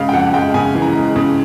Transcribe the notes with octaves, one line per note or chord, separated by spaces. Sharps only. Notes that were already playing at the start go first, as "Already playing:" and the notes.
Already playing: C#3 G#3 F5
G5
F2 F#5
G#3 G5
C#3 G#5
E3
A#5
G#3
C#3